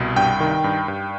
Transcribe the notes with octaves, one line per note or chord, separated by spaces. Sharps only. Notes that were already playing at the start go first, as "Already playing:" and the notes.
Already playing: C2 B2
G2 G5
D#3
G2
G2